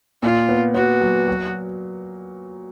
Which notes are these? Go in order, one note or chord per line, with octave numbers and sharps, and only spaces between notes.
A#2 F4
B3
B3 F#4
F#3
F#3